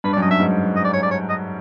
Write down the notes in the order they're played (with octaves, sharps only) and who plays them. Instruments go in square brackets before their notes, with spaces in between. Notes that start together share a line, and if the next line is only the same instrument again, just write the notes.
[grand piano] G2 [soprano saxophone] B4
[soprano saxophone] D5
[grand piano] F#2
[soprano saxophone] D#5
[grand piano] G2 [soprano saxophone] E5
[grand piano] G#2
[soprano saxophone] D#5
D5
C#5
D5
C#5
D#5